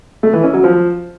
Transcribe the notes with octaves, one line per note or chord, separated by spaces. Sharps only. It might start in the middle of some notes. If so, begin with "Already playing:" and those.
A3
E3
C#4
F#3
F3